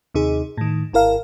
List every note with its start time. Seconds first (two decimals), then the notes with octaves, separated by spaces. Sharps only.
0.14 D#2 C3 D#4 G#4
0.57 A2 D#3
0.93 G#1 E4 A#4 F5